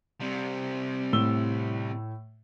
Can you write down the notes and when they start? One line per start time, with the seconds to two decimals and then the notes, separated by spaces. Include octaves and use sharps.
0.21 C3 G3
1.13 A2 E6 G7